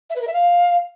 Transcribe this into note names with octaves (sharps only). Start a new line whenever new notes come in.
E5
B4
A#4
E5
F5